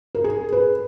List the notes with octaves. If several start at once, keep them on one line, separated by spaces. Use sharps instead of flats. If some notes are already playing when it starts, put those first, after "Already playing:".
A#4
G#4
B4